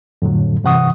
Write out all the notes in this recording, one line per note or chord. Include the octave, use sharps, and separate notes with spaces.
F2 A2 D3 F#3
G2 C3 E3 F#5 C#6 D#6